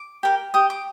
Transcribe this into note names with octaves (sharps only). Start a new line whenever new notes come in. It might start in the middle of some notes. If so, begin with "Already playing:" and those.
Already playing: D6
G4 A#4
G4 D#6
D6